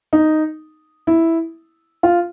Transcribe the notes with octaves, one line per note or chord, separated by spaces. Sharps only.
D#4
E4
F4